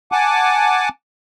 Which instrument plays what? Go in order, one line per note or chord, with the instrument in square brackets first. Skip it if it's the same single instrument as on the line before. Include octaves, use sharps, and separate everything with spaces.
[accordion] F#5 G#5 A5 D6